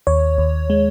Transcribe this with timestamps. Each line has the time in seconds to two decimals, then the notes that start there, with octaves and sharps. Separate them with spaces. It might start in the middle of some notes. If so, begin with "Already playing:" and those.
0.07 D#2 C#5
0.38 D#2
0.70 G#3